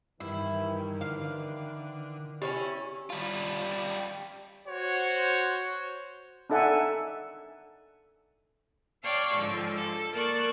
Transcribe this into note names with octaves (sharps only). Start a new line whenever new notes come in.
G2 D#3 E3 E4
D3 F5
C#4 D#4 E4 G4
G3 F4
F#4 C5 C#5
D4 D#4 A4 E5 F#5 G#5
C#5 D5 F5 G5 A5
G#2 D3 F3
A4
A#3 A#4 D5 A5 C#6 F#6